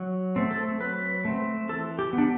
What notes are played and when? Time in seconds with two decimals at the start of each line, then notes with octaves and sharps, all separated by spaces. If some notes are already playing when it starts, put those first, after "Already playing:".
Already playing: F#3
0.36 A3 C4
0.51 A4
0.80 F#3 B4
1.25 A3 C4
1.69 E3 A4
1.99 G4
2.13 B3
2.18 D4